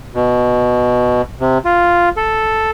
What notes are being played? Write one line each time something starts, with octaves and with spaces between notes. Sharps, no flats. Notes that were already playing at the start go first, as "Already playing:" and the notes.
B2
C3
F4
A4